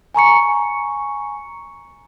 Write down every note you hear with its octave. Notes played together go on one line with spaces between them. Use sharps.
G#5 A#5 C#6 C#7